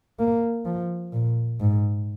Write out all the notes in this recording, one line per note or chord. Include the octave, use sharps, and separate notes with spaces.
A#3
F3
A#2
G#2